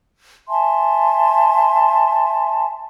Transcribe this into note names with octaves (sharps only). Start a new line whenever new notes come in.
E5 G#5 A5 C6